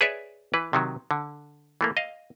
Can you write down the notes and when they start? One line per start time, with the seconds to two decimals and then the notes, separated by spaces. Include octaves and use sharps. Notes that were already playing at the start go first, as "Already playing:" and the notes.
0.01 G#4 B4 C#5 D5 E5
0.54 E3 B4
0.73 C3 D#3 F#3
1.11 D3
1.81 E3 A3 A#3
1.97 D#5 F5